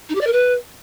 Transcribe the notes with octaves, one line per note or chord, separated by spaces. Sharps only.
D#4
G4
D5
A#4
B4